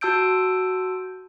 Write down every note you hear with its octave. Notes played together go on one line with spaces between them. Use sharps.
F#4 A5 E6 G6 D7